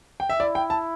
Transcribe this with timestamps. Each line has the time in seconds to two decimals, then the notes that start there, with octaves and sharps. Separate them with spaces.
0.20 G5
0.29 E5
0.40 E4 D5
0.55 G5
0.70 A5